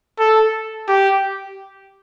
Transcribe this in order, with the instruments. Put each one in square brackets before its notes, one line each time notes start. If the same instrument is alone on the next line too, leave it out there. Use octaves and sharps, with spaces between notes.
[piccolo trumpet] A4
G4